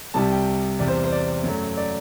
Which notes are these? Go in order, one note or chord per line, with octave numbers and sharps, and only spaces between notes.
C2 C3 G3 A5
G5
E2 C3 G3 D5
C5
C5
D5
F#2 F#3 A3
D5